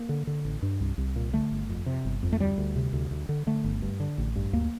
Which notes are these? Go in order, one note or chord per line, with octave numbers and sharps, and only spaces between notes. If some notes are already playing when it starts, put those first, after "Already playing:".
Already playing: A#3
D3
D3
A1
G2
C2
C2
A#2
D3 A3
G1
F2
C3
G1
F2
A3
D2 G3
D2
C3
D2
D2
D3
D3 A3
G1
G2
D3
A1
G2
D2 A#3